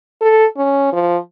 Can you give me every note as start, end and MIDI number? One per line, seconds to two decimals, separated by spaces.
0.21 0.46 69
0.57 0.90 61
0.93 1.17 53